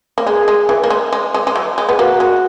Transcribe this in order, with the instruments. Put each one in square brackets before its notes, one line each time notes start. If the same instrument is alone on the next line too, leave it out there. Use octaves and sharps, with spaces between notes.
[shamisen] A#3
[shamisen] G#3 [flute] G#4
[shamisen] G#3
E3
A#3
G#3
G#3
G#3
G#3
F#3
G#3
[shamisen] B3 [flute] G#4
[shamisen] A#3 [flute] F#4
[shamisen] G#3